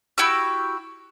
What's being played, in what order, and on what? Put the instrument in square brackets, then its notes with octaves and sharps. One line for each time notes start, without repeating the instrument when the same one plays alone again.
[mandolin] E4 F#4 G4 E6